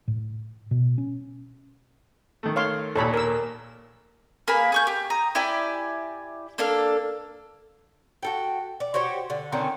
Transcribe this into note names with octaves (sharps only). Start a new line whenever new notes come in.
A2
B2
C#4
D#3 A3
C#5 F5 C6
D#2 A#2 A4 C#5 B5
A#4 E6
A#3 G#4 B4 B5
G#4 C#6 G6
G4
A#5 D#6
E4 G4 D5 G#5
A#3 D4 A4 F6
F#4 A4 G5
D5
F#4 G4 C5 C#5
D3
D3 D#3 C4 C#4